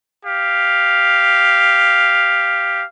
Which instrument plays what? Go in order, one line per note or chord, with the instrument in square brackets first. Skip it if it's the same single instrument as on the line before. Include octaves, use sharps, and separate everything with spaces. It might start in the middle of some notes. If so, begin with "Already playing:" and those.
[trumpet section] G4 F5